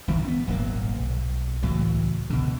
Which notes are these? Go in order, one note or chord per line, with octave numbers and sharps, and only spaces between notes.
D#1 C2 G#2 D#3
B3 C4
D#1 G#1 F#3 A#3
B1
C#2 A2 E3 F#3
C#2 B2 D3